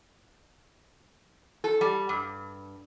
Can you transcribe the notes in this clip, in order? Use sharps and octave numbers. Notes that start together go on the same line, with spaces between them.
A4
G3
G2